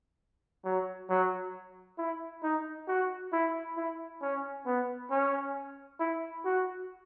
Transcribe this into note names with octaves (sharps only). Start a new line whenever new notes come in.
F#3
F#3
E4
D#4
F#4
E4
E4
C#4
B3
C#4
E4
F#4